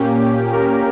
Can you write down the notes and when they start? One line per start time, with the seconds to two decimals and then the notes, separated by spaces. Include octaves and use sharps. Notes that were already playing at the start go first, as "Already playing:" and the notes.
Already playing: A#2 A#3 C#4 G4
0.20 G4
0.52 A#4